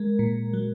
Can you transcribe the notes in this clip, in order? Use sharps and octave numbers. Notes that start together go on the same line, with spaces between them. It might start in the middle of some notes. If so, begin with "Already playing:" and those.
Already playing: G#3 A#4
A#2
F#3